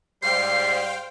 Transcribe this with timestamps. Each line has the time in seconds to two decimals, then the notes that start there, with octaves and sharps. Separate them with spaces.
0.22 G#2 G3 C5 F5 G5 C7